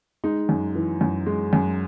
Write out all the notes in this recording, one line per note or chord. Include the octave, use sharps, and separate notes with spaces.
G#3 D#4
F#2
E3
F#2
G#3
F#2